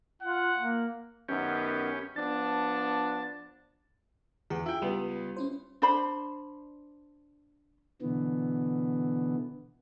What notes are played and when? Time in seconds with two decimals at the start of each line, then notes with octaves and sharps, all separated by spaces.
0.22 F4 F#5
0.57 A#3
1.29 F#2 D#3 B3 C#4 G4
2.16 F3 B3 D4 A5
4.50 E2 G#4
4.66 E4 F4 G5
4.82 C#2 G3 B3
5.36 C#4 E4 C5
5.82 D4 C5 B5
8.02 B2 D3 E3 B3